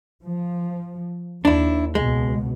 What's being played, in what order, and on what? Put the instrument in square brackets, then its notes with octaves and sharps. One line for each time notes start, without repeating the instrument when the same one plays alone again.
[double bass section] F3
[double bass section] D#2 [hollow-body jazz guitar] D4 E4
[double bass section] C#2 B2 [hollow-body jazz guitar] G#3